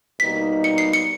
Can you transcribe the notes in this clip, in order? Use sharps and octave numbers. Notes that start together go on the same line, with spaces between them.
B2 G3 A#3 D#4 B6
C#7
C7
C#7